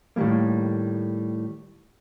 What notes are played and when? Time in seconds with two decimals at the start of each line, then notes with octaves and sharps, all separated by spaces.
0.16 A2 D#3 G3 G#3 A#3